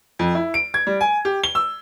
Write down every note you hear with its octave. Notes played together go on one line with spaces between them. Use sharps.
F2
E4
D7
G#6
G3
G#5
G4
G7
E6